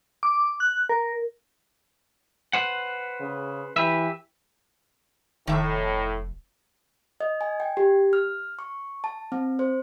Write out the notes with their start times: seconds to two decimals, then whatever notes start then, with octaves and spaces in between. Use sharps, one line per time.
0.23 D6
0.60 F#6
0.89 A#4
2.53 B4 C5 F#5
3.21 C#3
3.76 E3 G4 B4 E5
5.47 F1 A2 D#3 E5
7.20 D#5
7.41 G#5
7.60 G5
7.77 G4
8.13 F6
8.59 C#6
9.04 A5
9.32 C4
9.59 C5